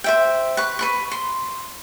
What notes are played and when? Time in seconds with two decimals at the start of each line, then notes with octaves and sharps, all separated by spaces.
0.04 C5 E5 G5
0.57 B4 C#6
0.79 B4 B5 C#6
1.11 C6